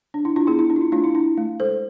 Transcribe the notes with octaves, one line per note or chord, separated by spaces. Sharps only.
D4
D4 E4
D4 F4
B3 E4 G#4
E4
D4
F4
E4
A3 D4 F4
E4
D4 E4
A3
G#3 A4 C5